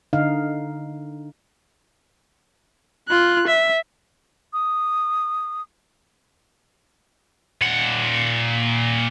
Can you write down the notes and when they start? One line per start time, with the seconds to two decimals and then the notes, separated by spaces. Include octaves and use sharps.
0.13 D3 D#4 F5
3.09 F4 F#6
3.47 E5
4.53 D#6
7.62 A#2 F#5